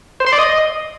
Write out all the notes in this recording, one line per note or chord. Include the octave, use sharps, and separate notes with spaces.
C5
C6
D5
D#5